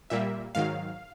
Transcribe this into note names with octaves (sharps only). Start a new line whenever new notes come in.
A#2 G3 A#3 E5
G#2 D#3 F#3 F5